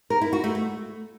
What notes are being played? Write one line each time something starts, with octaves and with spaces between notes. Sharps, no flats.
A#4
E4
F#4
A3
A3